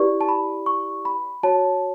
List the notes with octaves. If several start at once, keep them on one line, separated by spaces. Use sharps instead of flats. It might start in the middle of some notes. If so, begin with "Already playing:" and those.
Already playing: E4 G4 B4 D5 C#6
A5
B5
C#6
B5
F#4 C#5 A5